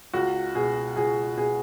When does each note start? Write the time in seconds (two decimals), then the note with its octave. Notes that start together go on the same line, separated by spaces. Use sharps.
0.14 C#2 F#4
0.55 B2 G#4
0.96 C#2 G#4
1.38 B2 G#4